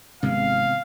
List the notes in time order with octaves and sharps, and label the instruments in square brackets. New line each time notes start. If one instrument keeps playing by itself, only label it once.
[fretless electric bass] G#1 [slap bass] C3 G#3 B3 [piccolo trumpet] F5